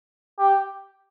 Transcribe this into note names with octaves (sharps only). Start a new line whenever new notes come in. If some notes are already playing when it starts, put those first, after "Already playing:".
G4